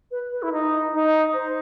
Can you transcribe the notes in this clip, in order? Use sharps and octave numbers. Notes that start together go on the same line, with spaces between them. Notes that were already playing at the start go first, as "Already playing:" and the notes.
B4
B4
E4
D#4
D#4
C5